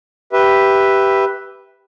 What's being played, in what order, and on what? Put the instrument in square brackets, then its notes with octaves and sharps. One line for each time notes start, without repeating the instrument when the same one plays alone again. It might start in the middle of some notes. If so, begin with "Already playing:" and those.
[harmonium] G4 B4 E5